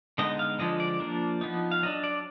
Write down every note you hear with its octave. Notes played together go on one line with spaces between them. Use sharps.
D3 G#3 B3 D#4 D#5
F5
D3 F3 G#3 D#5
D5
F3 A#3 D4
F3 B3 D#4
F5
F#3 D4 D#5
D5